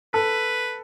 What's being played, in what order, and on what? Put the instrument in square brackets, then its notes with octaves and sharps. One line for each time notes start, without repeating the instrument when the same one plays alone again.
[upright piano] A4 [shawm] B4